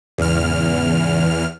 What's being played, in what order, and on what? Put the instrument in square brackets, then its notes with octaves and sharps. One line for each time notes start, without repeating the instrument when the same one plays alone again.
[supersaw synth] E2 F6 [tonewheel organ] G#2 C#3